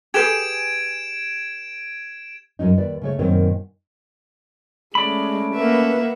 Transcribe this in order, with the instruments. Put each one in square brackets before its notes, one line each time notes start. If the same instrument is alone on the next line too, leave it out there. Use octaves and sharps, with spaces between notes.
[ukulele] G4 G#4 B4 [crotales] G#6 D7 E7
[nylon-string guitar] F#2 F#3 C#4 D#4
D#2 B4 D5
C#3 A3 C#5
F#2 A#2 D#3 B3 C4 C#5
[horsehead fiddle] G#3 [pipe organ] A3 C#4 [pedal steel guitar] D5 B5
[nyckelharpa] A#3 E5 [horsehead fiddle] B4 F#5